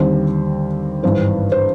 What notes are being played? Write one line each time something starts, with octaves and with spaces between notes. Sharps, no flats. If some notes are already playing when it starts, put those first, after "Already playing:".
Already playing: D#2 D3 G3 C4 C5
G#1 G2 E3 C5
C5